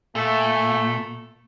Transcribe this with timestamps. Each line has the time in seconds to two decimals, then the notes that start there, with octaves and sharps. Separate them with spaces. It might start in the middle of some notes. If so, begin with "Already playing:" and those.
0.15 A#2 A3